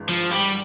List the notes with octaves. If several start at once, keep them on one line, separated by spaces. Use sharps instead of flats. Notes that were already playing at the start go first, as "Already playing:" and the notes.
Already playing: G#1 G2 E3 G#3
F3
G3